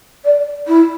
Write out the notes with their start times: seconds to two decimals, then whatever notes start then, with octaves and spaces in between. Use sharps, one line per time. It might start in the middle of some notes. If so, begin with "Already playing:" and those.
0.24 D5
0.67 E4